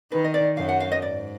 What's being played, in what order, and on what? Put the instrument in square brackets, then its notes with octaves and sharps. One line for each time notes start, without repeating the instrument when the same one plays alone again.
[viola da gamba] D#3 [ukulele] B4
[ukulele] D#5
D5
[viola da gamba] F#2 [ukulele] F5
[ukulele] F#5
F5
D#5
[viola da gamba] G#2 [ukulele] D5